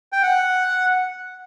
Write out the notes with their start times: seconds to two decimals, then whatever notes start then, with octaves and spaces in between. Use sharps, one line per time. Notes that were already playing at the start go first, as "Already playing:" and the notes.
0.13 G5
0.23 F#5